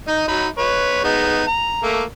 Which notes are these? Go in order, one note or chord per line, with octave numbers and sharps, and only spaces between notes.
D#4 D#5
F#3 D#4 B5
B4 C#5
G#3 B3 D#4
A#5
A3 A#3